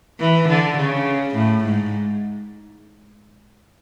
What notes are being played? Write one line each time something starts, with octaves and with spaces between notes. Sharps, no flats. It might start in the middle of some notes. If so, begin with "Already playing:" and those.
E3
D3
C#3
A2
G#2